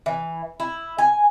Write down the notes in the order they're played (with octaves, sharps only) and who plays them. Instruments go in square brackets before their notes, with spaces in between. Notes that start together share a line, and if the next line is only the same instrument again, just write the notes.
[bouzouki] E3
E4
G#5